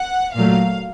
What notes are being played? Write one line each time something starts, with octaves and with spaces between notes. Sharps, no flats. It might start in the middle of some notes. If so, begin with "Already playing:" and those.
Already playing: F#5
A#2 F#3 A3 F5